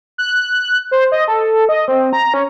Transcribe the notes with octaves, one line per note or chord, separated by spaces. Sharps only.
F#6
C5
D#5
A4
D#5
C4
A#5
C#4